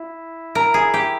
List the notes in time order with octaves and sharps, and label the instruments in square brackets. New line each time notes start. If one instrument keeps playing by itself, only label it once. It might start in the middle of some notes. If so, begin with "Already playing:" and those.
Already playing: [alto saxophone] E4
[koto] A#4
G#4
G4